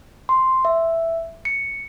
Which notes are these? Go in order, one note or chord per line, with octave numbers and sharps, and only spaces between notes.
C6
E5
C#7